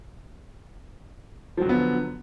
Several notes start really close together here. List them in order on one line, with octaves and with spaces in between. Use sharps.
F3 F#3 D3 B3